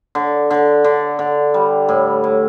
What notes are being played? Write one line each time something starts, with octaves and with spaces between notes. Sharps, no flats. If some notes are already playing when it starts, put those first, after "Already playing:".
D3
D3
D3
D3
G3
A2
A2